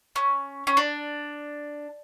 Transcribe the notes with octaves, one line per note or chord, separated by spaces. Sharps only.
C#4
C#4
D4